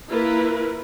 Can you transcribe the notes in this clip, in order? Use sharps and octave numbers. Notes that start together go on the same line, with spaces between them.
A#3 E4 F4 A#4 B4